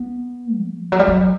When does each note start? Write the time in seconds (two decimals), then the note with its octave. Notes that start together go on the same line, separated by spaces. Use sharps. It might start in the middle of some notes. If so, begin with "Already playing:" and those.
Already playing: B3
0.57 F3
0.92 F#3
0.99 G3
1.08 F#3